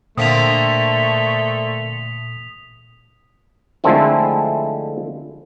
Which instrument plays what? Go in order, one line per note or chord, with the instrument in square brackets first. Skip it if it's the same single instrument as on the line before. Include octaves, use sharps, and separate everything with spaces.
[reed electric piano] A#2 [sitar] D3 A#3 C4 [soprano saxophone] A3 [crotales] D#6 B6 F7
[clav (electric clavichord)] D3 F3 G#3 A3 C4 E4